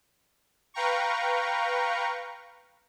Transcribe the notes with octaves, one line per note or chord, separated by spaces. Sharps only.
B4 F5 G5 A#5 C#6